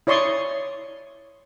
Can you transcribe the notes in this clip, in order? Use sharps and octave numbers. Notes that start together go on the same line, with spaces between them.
E4 C#5 D5 C6 C#6 D#6